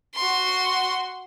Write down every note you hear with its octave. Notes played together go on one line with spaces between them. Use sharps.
F#4 C6